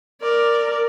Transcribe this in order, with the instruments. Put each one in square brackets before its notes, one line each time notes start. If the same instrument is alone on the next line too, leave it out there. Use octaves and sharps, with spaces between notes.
[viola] A#4 D5